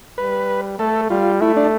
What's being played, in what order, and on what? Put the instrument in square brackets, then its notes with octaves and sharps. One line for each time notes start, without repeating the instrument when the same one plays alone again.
[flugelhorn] G3 [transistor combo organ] B4
[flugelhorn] A3 [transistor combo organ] A4
[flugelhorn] G3 [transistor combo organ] F4
[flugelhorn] A3 [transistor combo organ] E4
[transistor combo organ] D4